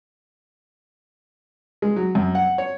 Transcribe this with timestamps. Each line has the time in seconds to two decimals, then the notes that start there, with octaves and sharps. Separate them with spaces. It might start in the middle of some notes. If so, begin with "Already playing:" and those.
1.82 G#3
1.96 F#3
2.15 F#2
2.35 F#5
2.58 C#5